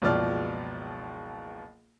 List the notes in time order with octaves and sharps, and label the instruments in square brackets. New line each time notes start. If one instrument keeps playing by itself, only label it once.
[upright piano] F#1 C#2 B2 F3 D5 F6